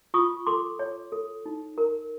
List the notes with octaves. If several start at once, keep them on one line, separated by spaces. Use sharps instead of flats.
F4 C#6 D#6
A4 C6 D6
C#5
A4
D#4
A#4